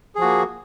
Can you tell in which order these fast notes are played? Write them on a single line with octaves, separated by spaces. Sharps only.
G#4 F3 F#4 A#3